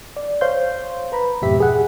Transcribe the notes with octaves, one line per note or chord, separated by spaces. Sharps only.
D5
C5 C#5 F5 C6 G6
B4 A#5 B5
F2 G#2 B2 G4 E5 B6
G#4 F#5